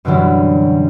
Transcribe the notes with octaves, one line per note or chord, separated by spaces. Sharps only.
F#2 B2 D3 E3 F#3 G3